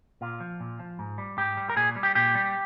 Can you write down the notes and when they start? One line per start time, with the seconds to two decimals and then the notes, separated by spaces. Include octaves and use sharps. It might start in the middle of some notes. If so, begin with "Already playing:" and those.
0.21 A#2 F4
0.40 F3
0.60 A#2
0.79 F3
0.99 G#2
1.18 G3
1.38 G#2 G4
1.57 G3
1.70 A#4
1.76 A#2 G#4
1.96 G3
2.03 G4
2.15 A#2 G4
2.35 G3